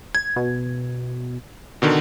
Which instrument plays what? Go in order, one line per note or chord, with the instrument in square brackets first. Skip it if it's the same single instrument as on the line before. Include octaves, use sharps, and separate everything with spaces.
[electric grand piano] G#6
[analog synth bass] B2
[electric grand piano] B2 D3 D#3